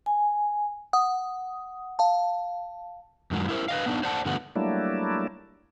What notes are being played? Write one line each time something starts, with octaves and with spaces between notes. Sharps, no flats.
G#5
F#5 D#6
F5 A5
F#2 D#3 F#3 G#3
E4 A#4 C5
B4 D#5 F5
B3 D4 D#4
C5 D5 F#5 A5
G2 D3 A3 B3 F#4
F#3 G3 A3 A#3 D4 E4